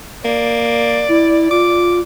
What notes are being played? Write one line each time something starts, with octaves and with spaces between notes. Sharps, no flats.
A#3 D5
E4
F4 D6